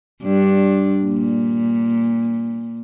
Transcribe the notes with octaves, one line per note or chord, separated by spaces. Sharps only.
G2 D4
A#2